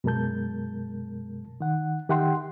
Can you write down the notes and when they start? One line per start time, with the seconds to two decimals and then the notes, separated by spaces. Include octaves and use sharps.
0.04 F#2 B2 G#3 A#4 A5 G6
1.60 D#3 F#5
2.09 D#3 G4 E5 F#5 G5 C6